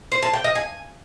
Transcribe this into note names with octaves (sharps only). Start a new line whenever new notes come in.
C5
A5
G5
D#5
G#5